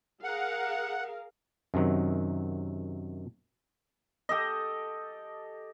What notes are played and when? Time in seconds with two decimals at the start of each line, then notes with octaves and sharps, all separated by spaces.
0.24 G#4 A#4 F5 F#5
1.74 F#2 C3 D#3 F#3
4.29 G4 A4 D#5